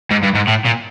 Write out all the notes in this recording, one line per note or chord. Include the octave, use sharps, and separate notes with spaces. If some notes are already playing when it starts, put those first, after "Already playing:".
G#2
G2
G#2
A2
A#2